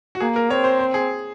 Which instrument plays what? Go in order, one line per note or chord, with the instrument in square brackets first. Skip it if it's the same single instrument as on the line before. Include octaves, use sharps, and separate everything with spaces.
[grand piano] F#4
[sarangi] A#3 [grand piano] G#4
[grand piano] A#4
[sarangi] C4 [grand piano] C#5
[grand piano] C5
C5
G#4